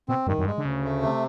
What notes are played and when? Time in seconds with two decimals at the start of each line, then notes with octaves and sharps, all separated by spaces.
0.09 B2 C4
0.27 G2 D#3
0.38 F#2
0.46 G2 G#3
0.58 D3
0.64 D2 C#3
0.84 A3
1.03 C3